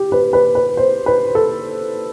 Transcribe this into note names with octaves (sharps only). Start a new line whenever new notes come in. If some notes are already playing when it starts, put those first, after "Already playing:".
Already playing: G4
B4
B4
B4
C5
B4
A4